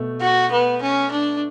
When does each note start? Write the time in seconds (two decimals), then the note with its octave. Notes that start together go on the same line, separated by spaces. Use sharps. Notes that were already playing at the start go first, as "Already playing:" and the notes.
Already playing: B2 A3
0.21 F#4
0.51 B3
0.82 C#4
1.11 D4